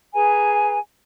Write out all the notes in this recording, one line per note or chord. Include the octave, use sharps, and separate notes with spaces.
G#4 B4 G#5 A#5